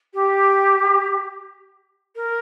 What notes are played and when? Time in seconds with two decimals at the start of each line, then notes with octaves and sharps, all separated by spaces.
0.14 G4
2.16 A#4